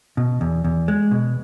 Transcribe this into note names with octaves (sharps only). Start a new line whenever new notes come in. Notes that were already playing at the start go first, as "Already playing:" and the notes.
B2
E2
E2
G#3
B2